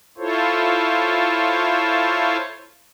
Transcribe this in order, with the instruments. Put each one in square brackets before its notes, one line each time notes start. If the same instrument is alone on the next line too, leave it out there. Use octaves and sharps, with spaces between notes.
[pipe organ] E4 F4 A4 C5 C#5